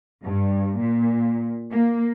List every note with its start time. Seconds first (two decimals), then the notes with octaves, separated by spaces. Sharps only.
0.25 G2
0.79 A#2
1.71 A#3